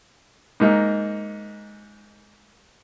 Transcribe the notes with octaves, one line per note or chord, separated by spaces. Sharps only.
G#2 A#3 D#4